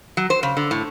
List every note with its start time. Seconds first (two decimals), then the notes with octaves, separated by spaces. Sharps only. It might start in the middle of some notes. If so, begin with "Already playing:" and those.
0.17 F#3
0.30 C5
0.43 C#3
0.57 D3
0.71 A2